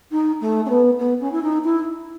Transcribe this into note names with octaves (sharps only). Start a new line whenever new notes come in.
D#4
A3
C#4
B3
B3
C#4
E4
D#4
E4